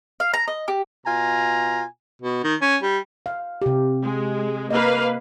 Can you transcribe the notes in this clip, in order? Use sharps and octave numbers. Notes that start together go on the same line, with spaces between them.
F5
A#5
D#5
G4
B2 F4 G#5 A#5
B2
D#3
C#4
G3
F5
C3 G4
G#3
A#3 B4 D#5 F5